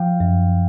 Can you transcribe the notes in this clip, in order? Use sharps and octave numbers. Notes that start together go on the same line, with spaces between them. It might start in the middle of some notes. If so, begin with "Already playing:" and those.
Already playing: F3 F5 G5
F#2